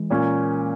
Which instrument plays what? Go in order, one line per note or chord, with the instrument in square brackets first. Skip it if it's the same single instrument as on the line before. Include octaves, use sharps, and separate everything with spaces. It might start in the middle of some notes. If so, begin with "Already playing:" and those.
Already playing: [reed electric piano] E3 G#3
[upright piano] A#2 A#3 C#4